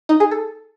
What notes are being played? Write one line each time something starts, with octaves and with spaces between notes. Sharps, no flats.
D#4
G#4
A4